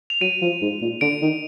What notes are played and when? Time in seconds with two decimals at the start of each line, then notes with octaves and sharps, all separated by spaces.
0.10 F7
0.21 F#3 D#7
0.42 F3
0.62 G#2
0.82 A#2
1.01 D3 D7
1.22 D#3